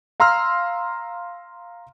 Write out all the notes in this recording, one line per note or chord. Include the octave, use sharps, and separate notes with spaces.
F5 A#5 C6 E6 F6